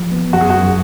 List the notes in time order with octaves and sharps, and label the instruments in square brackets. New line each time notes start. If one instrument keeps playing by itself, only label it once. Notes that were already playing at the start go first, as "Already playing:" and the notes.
Already playing: [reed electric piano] F3
B3
[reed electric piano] F#2 [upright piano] F#4
[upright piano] G#4
F#4
[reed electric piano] F#2